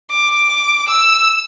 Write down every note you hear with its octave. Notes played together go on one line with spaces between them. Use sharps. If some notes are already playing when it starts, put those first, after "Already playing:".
D6
E6